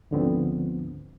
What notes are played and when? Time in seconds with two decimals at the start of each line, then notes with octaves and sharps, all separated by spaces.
0.11 D2 G#2 D3 F3 B3 C4